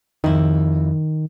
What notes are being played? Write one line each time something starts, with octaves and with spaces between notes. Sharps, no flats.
F2 D#3 E4